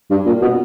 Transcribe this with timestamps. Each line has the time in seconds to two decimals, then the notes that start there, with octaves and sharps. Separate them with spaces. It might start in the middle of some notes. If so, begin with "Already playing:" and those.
0.10 G2
0.26 A#2
0.42 B2